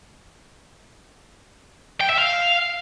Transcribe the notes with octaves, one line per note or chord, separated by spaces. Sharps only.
G5
E5
F5